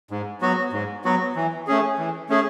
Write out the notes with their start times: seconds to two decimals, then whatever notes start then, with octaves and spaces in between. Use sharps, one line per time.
0.11 G#2
0.41 F#3 B3 F#4
0.73 G#2
1.05 F#3 B3 F#4
1.36 E3
1.67 A3 C#4 G#4
1.99 E3
2.29 A3 C#4 G#4